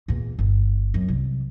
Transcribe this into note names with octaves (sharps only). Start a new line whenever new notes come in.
E2 A#2
G1
F#2
C2